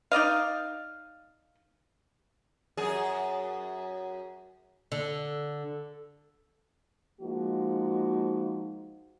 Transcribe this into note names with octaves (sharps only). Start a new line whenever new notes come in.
D#4 D5 D#5 F5
F#2 G#4
D3
F3 G#3 A#3 D#4 F#4